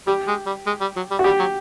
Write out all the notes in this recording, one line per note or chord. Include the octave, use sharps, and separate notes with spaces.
G3 G4
G#3
G3
G#3
G3
F#3
G3
F#4
G3 G4
F#3